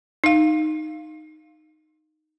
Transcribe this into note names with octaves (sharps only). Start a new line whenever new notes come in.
D#4 F5